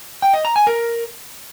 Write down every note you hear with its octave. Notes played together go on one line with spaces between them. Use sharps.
G5
D#5
A#5
G#5
A#4